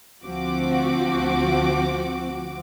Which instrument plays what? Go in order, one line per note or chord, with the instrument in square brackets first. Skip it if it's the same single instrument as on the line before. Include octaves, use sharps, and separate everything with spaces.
[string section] D2 F3 C4 F#4 D6